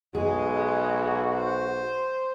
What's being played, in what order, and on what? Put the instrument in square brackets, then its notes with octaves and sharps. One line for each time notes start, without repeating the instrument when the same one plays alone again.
[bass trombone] B1 [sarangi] G#3 [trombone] F#4 [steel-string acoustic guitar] G#4
[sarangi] C5